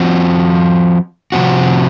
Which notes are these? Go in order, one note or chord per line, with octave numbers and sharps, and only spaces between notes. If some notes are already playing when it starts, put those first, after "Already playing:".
Already playing: F3 C4 F#4
C3 F3 C4 F#4